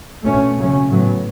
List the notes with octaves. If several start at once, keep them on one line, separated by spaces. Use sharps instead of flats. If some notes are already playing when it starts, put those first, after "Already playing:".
B2 A3 C#4
C#3 F#3 A3 C#4
A2 F#3 B3